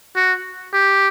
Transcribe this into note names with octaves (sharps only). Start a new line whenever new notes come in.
F#4
G4